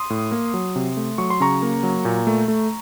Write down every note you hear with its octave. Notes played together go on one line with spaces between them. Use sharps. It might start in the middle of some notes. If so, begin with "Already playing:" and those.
Already playing: C6 D#6
A2
A#3
F#3
C3
A3
F#3 C#6
C6
C#3 A#5 C#6
A#3
F#3
A#2
A3
A3